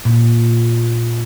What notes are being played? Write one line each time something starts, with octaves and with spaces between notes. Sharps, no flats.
A#2